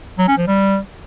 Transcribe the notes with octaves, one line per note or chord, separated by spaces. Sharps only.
F#3
C#4
F3
G3